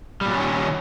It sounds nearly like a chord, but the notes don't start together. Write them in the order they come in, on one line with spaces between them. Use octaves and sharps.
G3 A#2 F#3 C#4 D#3